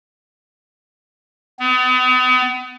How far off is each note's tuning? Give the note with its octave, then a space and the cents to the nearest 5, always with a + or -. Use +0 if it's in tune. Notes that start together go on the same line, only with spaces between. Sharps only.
B3 +40